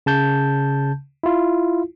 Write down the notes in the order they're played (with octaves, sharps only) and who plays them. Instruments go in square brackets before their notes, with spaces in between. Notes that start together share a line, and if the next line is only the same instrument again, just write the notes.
[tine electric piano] C#3 A5 G6
E4 F4